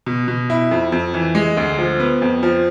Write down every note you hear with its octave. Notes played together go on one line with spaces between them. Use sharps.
B2
B2
E4
F2
F2
E3
G#3
D2
F3
B3
F2
F3